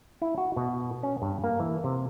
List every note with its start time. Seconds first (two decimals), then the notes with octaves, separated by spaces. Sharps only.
0.22 E4
0.38 F#4
0.57 B2
1.03 C#4
1.22 G2
1.44 A#3
1.60 E3
1.84 C3